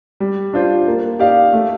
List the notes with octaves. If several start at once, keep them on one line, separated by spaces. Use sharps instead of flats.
G3
D4 F4 C5
A#3
D#4 G4 D5 F5
A3